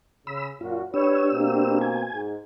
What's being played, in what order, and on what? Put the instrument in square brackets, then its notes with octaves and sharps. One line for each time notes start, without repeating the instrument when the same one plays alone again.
[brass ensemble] C#3 [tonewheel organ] B5 E6
[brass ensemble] F#2 A#2 F#4 [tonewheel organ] F4
[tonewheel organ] D4 G4 E6 [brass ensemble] B4 C#5
[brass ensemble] B2 A#3 C4
[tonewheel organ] G#5
[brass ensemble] G#2